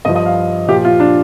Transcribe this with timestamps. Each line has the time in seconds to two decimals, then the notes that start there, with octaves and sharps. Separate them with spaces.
0.05 G2 F3 D#5
0.16 D#5
0.26 F5
0.68 A#2 F3 G4
0.85 F4
1.00 D4